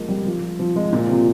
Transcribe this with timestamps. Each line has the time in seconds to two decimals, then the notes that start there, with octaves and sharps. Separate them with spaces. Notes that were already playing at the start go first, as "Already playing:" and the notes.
Already playing: F3 G#3 A#3
0.09 G3
0.26 F3
0.59 F3
0.76 G#3
0.93 A#2
1.09 C3